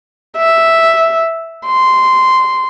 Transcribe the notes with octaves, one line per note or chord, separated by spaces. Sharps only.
E5
C6